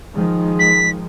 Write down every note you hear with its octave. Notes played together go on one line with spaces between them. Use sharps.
D#3 F3 G#3
B6